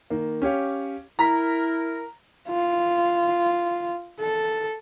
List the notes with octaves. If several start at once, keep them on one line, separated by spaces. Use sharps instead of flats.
D#3 A#3
C#4 G4 C#5 F5
E4 A#4 A#5 B6
F4
A4